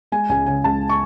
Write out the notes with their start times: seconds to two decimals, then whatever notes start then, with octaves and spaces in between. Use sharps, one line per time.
0.12 G#3 G#5
0.29 C#2 G#5
0.46 C#3 G#5
0.64 C#2 A5
0.89 C#6